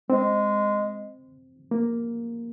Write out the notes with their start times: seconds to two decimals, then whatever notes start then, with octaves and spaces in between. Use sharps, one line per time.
0.10 G#3 C4
1.71 A#3